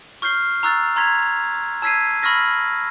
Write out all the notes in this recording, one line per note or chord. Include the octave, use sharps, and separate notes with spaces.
C#6 F6 G6 C7 G7
A#5 C#6 E6 F#6 A6
A#5 C6 G#6 B6 F7
A5 E6 G#6 B6 C7 D#7
B5 C#6 E6 F6 A#6 B6